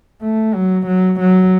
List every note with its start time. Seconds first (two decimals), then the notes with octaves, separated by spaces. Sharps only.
0.22 A3
0.55 F#3
0.87 F#3
1.21 F#3